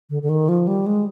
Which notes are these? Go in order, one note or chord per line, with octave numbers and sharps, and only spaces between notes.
D3
D3
D#3
F3
G3
G#3